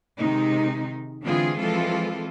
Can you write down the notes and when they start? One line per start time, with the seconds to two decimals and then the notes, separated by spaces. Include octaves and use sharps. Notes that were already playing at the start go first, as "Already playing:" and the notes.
0.19 C3 D#3 G#3 D#4
1.23 D3 E3 G#3 C4 F4 G#4
1.57 E3 F3 G#3 C4 F4 A4